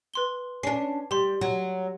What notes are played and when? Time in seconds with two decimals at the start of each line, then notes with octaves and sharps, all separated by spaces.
0.14 B4 C6 G7
0.63 C#4 D4 C7
1.11 G3 G4 C6
1.41 F#3